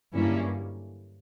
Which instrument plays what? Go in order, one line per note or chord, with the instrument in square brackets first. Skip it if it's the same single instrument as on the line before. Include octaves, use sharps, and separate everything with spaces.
[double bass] G2 [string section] D3 F#3 A#3 C#4 E4